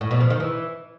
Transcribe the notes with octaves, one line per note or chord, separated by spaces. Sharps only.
A2
B2
F3
D#3
E3